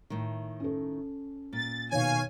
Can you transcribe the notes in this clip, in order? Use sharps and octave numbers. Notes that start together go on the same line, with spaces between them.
A2 D#3
C#4 A4
A#2 A6
B2 D#3 C#5 F5 G#5